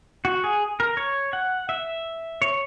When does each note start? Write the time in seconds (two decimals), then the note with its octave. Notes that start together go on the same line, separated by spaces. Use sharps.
0.25 F#4
0.44 G#4
0.80 A#4
0.97 C#5
1.33 F#5
1.69 E5
2.42 C#5